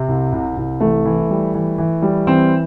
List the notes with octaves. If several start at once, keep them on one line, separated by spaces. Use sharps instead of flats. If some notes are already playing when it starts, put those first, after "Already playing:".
Already playing: C3 C4
C2
C2
C2
E3 A3
E3
G3
E3
E3
G3
E3 C4